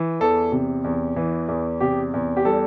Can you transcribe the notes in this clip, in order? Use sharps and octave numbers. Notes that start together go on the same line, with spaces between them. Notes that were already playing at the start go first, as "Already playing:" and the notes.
Already playing: E3
E2 A4
C3
E2
E3
E2
C3 G4
E2
G4
G3 A4